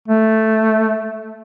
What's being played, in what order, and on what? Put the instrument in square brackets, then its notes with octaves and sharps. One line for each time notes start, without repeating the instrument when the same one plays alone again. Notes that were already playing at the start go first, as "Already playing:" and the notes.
[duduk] A3